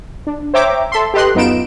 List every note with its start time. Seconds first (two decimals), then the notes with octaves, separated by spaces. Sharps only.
0.27 D4
0.54 C5 C#5 E5 G5 A#5 D6
0.92 A4 E5 C6
1.14 G4 A4 B4 D#5 C6 F#6
1.35 F#2 B3 D#4 F4 D7 E7